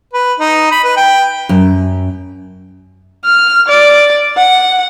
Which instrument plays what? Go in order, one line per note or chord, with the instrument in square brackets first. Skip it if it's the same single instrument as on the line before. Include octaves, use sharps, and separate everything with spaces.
[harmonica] B4
D#4
B5
B4
G5
[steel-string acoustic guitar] F#2
[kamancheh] F6
D5
F#5